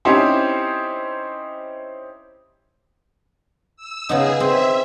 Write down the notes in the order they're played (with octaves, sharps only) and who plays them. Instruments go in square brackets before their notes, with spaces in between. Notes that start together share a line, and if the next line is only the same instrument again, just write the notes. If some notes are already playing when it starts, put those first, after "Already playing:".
[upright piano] C4 C#4 D#4 E4 G4 C5
[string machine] E6
[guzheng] C#3 B3 D#4 [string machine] G#4
[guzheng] C4 [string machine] E5